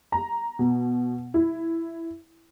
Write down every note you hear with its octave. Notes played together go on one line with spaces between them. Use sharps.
A#5
B2
E4